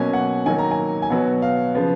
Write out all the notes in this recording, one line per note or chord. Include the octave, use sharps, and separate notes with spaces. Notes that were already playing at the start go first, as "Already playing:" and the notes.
Already playing: B2 F#3 A#3 C#4 G#5
F#5
D#3 F#3 A#3 G#5
A#5
G#5
G#5
B2 F#3 B3 F#5
F5
C#3 F3 B3